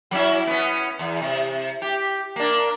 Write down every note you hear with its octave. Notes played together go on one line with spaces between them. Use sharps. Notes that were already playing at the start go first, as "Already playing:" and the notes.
F#3 C#4 E4
B3 C#4
E2
C3
G4
A#3 D4